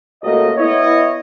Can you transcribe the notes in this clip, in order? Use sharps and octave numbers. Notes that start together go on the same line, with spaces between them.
C#2 A3 A#3 F#4 D#5
B3 E4 C#5 D#5